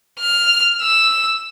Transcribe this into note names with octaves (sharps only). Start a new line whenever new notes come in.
F6
E6